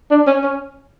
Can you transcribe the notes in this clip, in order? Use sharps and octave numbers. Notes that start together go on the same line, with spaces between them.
D4
C#4
C#4